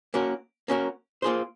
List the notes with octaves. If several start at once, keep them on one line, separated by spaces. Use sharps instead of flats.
A#3 C#4 F#4 A#4
A#3 C#4 F#4 A#4
A#3 F4 G#4 C5